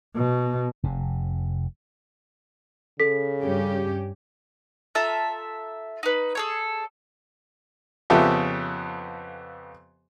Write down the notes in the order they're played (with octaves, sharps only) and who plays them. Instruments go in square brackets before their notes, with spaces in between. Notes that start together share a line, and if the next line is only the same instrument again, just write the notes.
[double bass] B2
[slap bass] F1 C3
[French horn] C#3 [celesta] A4 B6
[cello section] G2 C#4 G4
[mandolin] F4 A4 E5 A#5
D#4 B4
G#4 A4 C#5
[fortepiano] F2 C#3 B3 G4 A4 E5